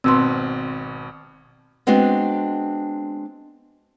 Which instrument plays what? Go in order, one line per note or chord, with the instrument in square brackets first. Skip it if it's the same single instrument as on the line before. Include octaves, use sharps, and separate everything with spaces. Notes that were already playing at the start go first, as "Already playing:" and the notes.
[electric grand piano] G#1 B2 B4 [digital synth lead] C4 [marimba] C6 E6
[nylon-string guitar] G#3 B3 C4 D4 F#4